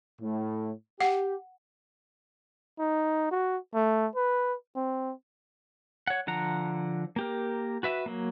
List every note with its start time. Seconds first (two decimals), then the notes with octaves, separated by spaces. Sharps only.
0.21 A2
1.01 G4 F#5
2.79 D#4
3.31 F#4
3.75 A3
4.16 B4
4.75 C4
6.07 C#5 F#5
6.27 D3 F3 F#5 A#5
7.16 A#3 G4 A#4
7.83 F#4 B4 E5
8.06 F#3 A#3